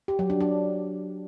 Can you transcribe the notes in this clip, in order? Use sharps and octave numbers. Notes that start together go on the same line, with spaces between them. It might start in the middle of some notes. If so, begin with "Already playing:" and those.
G4
F#3
D4
D4